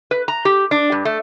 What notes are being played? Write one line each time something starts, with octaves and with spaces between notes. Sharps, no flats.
B4
A#5
G4
D4
G2
A3